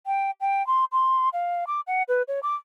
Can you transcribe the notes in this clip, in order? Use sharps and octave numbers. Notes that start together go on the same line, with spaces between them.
G5
G5
C6
C6
F5
D6
F#5
B4
C#5
D6